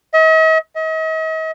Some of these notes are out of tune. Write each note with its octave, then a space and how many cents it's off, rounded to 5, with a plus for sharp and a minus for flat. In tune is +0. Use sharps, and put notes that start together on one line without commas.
D#5 +45
D#5 +40